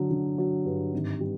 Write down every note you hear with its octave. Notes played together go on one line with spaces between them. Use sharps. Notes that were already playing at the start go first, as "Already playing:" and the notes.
Already playing: D3 F#3
D3
F#3
G2
G#1
G3